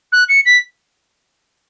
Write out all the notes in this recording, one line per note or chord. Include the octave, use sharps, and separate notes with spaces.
F#6
C#7
B6